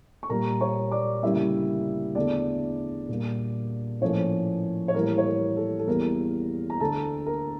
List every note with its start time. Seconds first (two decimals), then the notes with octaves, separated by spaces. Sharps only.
0.23 C#6
0.29 A#2 G3 A#3 A#4 A#5
0.61 C#5 C#6
0.91 D5 D6
1.23 D2 C#3 G3 A#3 E4 E5
2.15 E2 D3 A3 D4 D5
3.09 A#2 G3 A#3
4.01 A2 F3 A#3 C#4 C#5
4.88 C#5
4.94 A2 E3 G3 A#3 A#4
5.18 C#5
5.25 A#4
5.57 A4
5.79 A4
5.87 E2 E3 G3 A#3 A#4
6.70 A#5
6.80 D2 D3 A3 A4 A5
7.26 A#4 A#5